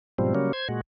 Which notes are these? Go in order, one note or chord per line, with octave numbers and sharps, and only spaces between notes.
G#2 B2 F3 G3 C4
C#3 F#3 G3 A#3 C#4
C5 G#6
A#2 G#3 F#4